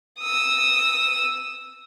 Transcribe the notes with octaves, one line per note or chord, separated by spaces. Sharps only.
D#6 E6